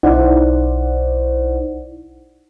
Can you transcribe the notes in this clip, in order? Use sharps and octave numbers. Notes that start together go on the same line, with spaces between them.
B1 D#4 E4 C5 D5 F#5